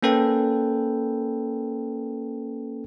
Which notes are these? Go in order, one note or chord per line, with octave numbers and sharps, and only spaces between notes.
A#3 C#4 A4 B4 G5